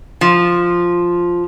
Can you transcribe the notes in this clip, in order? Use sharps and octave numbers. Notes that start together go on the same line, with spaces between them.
F3